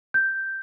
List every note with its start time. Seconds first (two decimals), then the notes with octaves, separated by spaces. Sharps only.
0.14 G6